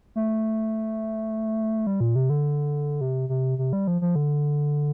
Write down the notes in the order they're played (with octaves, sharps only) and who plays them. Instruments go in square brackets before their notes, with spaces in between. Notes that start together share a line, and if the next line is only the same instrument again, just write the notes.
[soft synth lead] A3
G3
A#2
C3
D3
C3
C3
C3
G3
F3
F3
D3